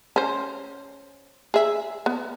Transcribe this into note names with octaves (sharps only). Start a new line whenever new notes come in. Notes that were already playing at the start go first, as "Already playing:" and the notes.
C#4 C5
G#4 E5
B3